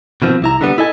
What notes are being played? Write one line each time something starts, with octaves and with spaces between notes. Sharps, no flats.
B2 D#3 F3 C4
C2 E4 A#5
D3 G3 B3
E4 A4 D#5 G#5